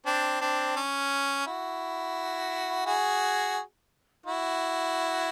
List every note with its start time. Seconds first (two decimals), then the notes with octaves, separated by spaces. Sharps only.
0.06 C4 D4
0.41 C4 D4
0.76 C#4
1.46 E4 F#4
2.86 F#4 G#4
4.26 E4 F#4